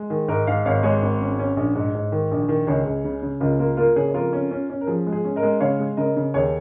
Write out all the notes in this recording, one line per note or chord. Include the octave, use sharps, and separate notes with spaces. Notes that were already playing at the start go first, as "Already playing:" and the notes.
Already playing: G#3
D#3 G#4
G#2 A#4 D#5
G#2 F5
G#1 C#5 F5
G#3 G#4 C#5
G#1
C#4
C#4
A#1
G#2
G#2
D#3
A#1
D#3
C#2 G#4 C#5
C#2
C#3
C#3
C#2 F4 A#4
A#3 F4 A#4
A#3 F4 A#4
C#3 G#4 C#5
C#5
F2 F4 A#4
C#4
C#4
C#4
A#4
F3 G#4
G#3
G#4
C#4
A#4 D#5
G#3
C#3 C#5 F5
G#3
C#3 A#4 D#5
C#3
D#2 G#4 C#5